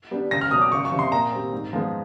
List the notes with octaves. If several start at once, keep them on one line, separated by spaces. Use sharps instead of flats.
G3 B3 D4
C#2 A#6
F6
B2 F#3 D#6
D6
C#2 C#6
C#6
C3 F3
C6
A#2 A#5
G3 C4
G#2
F3 G#3 B3